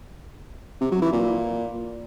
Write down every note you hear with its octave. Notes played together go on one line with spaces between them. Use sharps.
C3
F#3
E3
A#2